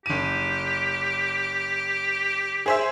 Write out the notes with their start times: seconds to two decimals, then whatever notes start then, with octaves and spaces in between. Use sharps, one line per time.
0.06 F#1 G4 D#7
2.66 G#4 C5 E5